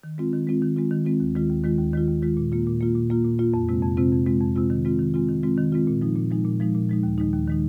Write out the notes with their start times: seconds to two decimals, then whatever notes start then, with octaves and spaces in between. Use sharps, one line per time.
0.04 D#3
0.18 G#3 C4 F4
0.33 D#3
0.47 G#3 C4 F4
0.62 D#3
0.76 G#3 C4 F4
0.91 D#3
1.05 G#3 C4 F4
1.20 D#2
1.35 D#3 G#3 F4
1.49 D#2
1.64 D#3 G#3 F4
1.79 D#2
1.93 D#3 G#3 F4
2.08 D#2
2.22 D#3 G#3 F4
2.37 A#2
2.52 A#3 F4
2.67 A#2
2.81 A#3 F4
2.95 A#2
3.10 A#3 F4
3.25 A#2
3.39 A#3 F4
3.54 F2
3.69 C3 G#3 C4 F4
3.82 F2
3.97 C3 G#3 C4 F4
4.12 F2
4.26 C3 G#3 C4 F4
4.41 F2
4.56 C3 G#3 C4 F4
4.70 D#3
4.85 G#3 C4 F4
4.99 D#3
5.14 G#3 C4 F4
5.29 D#3
5.43 G#3 C4 F4
5.58 D#3
5.72 G#3 C4 F4
5.87 A#2
6.02 F3 G#3 D#4
6.16 A#2
6.31 F3 G#3 D#4
6.45 A#2
6.60 F3 G#3 D#4
6.75 A#2
6.89 F3 G#3 D#4
7.03 D#2
7.18 D#3 G#3 D#4
7.33 D#2
7.47 D#3 G#3 D#4